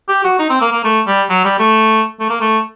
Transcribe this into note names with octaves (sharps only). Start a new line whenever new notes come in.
G4
F#4
D#4
C4
A#3
A#3
A3
G3
F#3
G3
A3
A3
A#3
A3